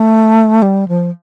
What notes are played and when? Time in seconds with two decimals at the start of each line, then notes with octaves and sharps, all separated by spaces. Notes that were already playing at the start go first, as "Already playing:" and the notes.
Already playing: A3
0.62 G3
0.88 F3